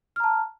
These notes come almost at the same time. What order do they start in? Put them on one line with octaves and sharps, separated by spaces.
F6 A#5 A5